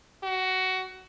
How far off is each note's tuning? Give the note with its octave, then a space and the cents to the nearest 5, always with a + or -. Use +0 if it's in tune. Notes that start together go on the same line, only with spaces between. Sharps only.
F#4 +15